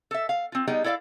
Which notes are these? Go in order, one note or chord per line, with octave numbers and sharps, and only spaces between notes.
A4 E5
F5
C4 F4
G3 B3 D#4 G#4 D#5 G5
E4 A4 D5 E5 F5